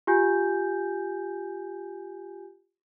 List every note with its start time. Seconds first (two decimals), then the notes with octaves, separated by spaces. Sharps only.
0.07 F4 G4 G#5 G6